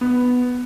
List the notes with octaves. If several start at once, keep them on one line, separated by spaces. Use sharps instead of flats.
B3